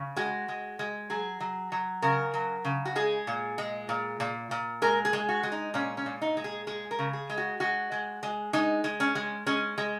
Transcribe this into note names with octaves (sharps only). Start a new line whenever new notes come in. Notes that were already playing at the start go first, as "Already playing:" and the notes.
Already playing: C#3
G#3 F#4
G#3
G#3
F#3 G#4
F#3
F#3
C#3 A#4
F#3
C#3
F#4
G#3 G#4
A#2
G#3
A#2
A#2
A#2
G#3 A#4
G#4
G#3
F#4
G#3
D#4
A#2 C#4
C#4
A#2
D#4
G#3
G#4
G#3 G#4
A#4
C#3
G#4
G#3
F#4
G#3 F#4
G#3
G#3
G#3 D#4
G#3
C#4
G#3
G#3 C#4
G#3